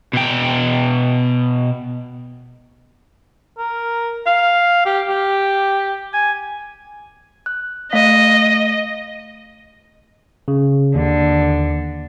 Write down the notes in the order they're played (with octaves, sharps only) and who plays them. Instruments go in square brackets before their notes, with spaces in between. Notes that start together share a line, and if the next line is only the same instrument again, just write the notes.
[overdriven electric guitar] B2 G5
[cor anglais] A#4
F5
G4
G4
G#5
[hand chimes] F#6
[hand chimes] A3 F5 B6 [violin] D#5
[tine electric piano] C#3
[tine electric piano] D#2 [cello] D3